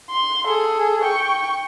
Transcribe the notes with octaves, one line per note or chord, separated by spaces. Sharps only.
C6
G#4 A4
G5 C#6